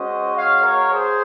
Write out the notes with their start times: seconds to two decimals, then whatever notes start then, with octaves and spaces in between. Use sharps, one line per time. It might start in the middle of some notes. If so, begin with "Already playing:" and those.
Already playing: G#3 C#4 F#4 C5 D#5
0.35 C#5 F5
0.62 A#4 C#5
0.91 G#4 C5